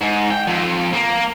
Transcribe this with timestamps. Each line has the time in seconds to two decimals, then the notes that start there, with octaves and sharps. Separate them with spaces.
0.01 G#2
0.31 G5
0.47 F2
0.94 A#3